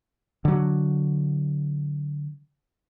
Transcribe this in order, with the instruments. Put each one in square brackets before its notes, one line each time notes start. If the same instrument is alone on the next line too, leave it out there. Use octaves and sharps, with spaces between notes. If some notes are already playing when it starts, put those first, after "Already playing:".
[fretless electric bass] D3 F#3